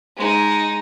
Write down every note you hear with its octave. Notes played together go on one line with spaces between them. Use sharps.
G#3 D#4